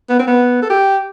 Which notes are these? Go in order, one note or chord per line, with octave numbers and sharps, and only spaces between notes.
B3
C4
B3
A4
G4